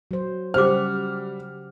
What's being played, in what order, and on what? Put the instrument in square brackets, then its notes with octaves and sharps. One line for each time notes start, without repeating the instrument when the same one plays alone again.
[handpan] F#3 C5
[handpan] C#3 G4 F#5 [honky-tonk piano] G3 F6 [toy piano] C5 D6